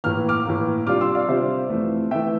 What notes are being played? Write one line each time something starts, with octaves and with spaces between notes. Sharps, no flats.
A2 E3 A#3 F6
D6 F6
A2 E3 A#3
C3 G3 D4 F4 D6 F6
C6 E6
D5 F5
C3 G3 D4 F4 C5 E5
F2 E3 A3
E3 A3 E5 G5